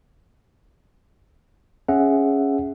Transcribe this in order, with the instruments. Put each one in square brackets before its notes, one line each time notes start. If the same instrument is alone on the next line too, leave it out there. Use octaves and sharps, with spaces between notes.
[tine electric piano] C#4 G#4 E5 F#5